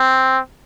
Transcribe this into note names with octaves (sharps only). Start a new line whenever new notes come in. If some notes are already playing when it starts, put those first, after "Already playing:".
Already playing: C4